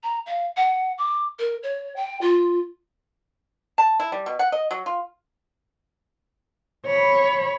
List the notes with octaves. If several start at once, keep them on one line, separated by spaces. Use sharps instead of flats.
A#5
F5
F#5
D6
A#4
C#5
G5
F4
A5
E4
G3
B2
F#5
D#5
F#3
F4
C#5 B5